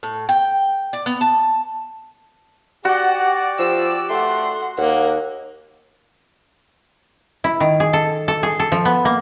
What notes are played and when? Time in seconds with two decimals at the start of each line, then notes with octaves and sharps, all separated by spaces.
0.03 A2
0.29 G5
0.93 D5
1.06 B3
1.21 A5
2.85 F#4 G4 D5 F#5
3.59 F3 E6
4.10 A3 F#5 C6
4.77 D#2 A#3 F#5
7.44 E4
7.60 D#3
7.80 G#4
7.93 A4
8.28 A4
8.43 G#4
8.59 A4
8.72 F3
8.85 B3
9.05 A#3